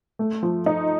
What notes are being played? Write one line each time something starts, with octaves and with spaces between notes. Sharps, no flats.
A3
F3
D#4